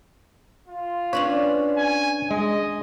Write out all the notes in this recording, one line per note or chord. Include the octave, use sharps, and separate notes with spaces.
F4
C#4 D4 B4 C#5
G#5
G#3 D#5